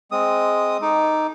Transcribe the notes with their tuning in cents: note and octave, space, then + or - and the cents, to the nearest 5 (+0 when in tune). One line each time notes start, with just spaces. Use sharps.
G#3 +0 C4 +0 D#6 +0
D#4 +0 A4 -20 D6 +0